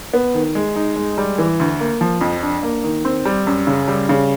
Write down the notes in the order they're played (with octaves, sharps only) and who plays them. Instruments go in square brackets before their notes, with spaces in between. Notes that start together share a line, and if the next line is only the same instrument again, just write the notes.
[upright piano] B3
D#3
G#3
D#4
G#3
G3
E3
D2
A#3
F3
F2
D4
A#3
D#3
C4
G3
F#2
C#3
G3
C#3